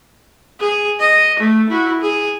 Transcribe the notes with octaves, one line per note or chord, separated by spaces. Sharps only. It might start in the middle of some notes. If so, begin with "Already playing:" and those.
G#4
D#5
A3
E4 F#4
G#4